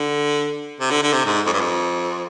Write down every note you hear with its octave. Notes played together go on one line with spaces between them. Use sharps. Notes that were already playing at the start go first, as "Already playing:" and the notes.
Already playing: D3
C3
D3
D3
C3
G#2
F2
G2
F2